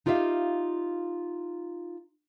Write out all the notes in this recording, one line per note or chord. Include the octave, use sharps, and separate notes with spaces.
D#4 F4 G4 B4 E5 F5